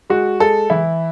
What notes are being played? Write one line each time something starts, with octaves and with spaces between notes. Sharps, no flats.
G#3 F#4
G#3 A4
E3 E4